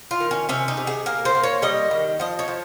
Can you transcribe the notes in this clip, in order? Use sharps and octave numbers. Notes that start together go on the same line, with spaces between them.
F4
D#3
C#4
C3 C#4
D#4
C3
G#4
A#3 A#4
C5
A#3
C#5
G3 D#5
D#3
F3 D#5
C#5
F3